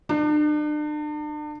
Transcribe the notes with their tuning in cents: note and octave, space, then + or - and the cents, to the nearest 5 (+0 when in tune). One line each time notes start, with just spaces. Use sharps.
D4 +40